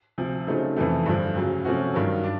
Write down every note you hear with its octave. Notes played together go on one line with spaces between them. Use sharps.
D2 C3 F3
C#3 F#3 A3 C4 D#4
F2 C3 E3 A3
G2 D3 F3
D2 C#3 F#3
C3 F3 A3 C#4 F#4
G2 D#3 F#3
D4